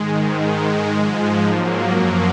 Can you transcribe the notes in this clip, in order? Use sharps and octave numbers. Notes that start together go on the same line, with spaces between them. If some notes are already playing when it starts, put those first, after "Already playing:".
Already playing: G#2 D#3 G#3
G#3
G#2 F3
F#3 A#3
F#2 F3